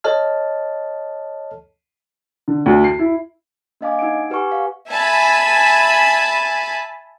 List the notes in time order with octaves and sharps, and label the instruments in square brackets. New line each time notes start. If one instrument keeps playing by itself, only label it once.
[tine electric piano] A4 C#5 D#5 A5 F6
[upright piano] D3
D2
C7
E4
[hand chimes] A#3 D4 D#5 F5 G#5 D6
D#4 F#5 D7
G4 B4 F#5 G#5 C#6 D6
F5
[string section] E5 G#5 A5 B5